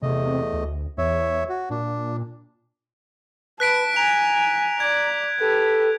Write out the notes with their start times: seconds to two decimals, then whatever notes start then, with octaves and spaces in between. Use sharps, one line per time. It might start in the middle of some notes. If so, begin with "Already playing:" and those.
0.03 E2 C3 A3 D#5
0.53 D2
0.98 E2 C#5 E5
1.49 F#4
1.70 A#2 D4
3.60 B4 A5 F#6 B6 D7
3.96 G#5 A#5 F7
4.80 D5 G#6
5.40 G4 A4 B4